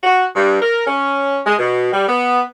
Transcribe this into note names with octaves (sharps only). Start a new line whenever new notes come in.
F#4
G2
A#4
C#4
G#3
B2
G3
B3